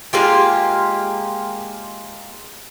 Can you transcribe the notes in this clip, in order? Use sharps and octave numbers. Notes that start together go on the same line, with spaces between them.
G#3 A#3 F4 G4